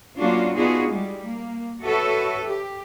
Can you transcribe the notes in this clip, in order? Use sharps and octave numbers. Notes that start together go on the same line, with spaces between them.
F#3 A#3 C#4 D4 F4 F#4
B3 D4 D#4 F4 F#4 G#4
G3 G#3
A#3
F#4 A4 B4 C#5 E5
G4